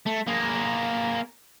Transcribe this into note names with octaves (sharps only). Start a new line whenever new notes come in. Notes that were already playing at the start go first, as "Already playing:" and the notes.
A3
A#3 G#4